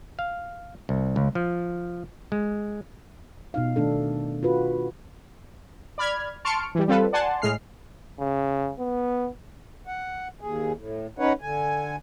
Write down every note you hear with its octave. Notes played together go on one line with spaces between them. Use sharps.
F5
C2
C#2
F3
G#3
B2 D#4 F5
D#3 A3 D4 A4
F4 F#4 B4
D5 B5 F6 G#6
A5 C6 C#6 F6 C#7 D7
E3 G3
G3 C4 F4 A4 B4
D5 F#5 G#5 A5 C6
A2 G#3 F6 C7
C#3
B3
F#5
D#2 G#4
A2
C#4 D#4 B4 C#5 F#5
D3 G#5